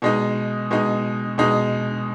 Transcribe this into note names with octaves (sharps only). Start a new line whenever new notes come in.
B2 G#3 D#4
B2 G#3 D#4
B2 G#3 D#4